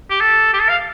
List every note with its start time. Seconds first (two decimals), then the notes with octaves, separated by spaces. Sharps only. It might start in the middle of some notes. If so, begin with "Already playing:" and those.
0.10 G4
0.20 A4
0.54 G4
0.61 A4
0.69 F5